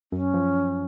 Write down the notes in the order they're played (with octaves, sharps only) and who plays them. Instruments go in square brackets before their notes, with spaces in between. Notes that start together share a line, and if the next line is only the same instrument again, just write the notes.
[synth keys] F#2 [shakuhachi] C#4
[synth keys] F3